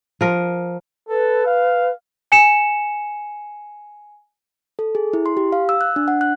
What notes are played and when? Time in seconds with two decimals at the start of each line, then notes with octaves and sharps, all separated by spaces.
0.21 F3 A#4
1.09 A4 B4
1.46 F5
2.32 G#5 C#7 E7
4.79 A4
4.95 G#4
5.13 E4
5.26 C6
5.37 G4
5.52 F5
5.69 E6
5.81 F#6
5.96 D4
6.08 F#5
6.21 F#6